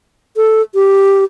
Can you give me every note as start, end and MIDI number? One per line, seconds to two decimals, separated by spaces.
0.36 0.62 69
0.75 1.24 67